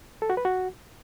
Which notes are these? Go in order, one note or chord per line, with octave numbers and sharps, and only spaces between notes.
A4
F#4
B4
F#4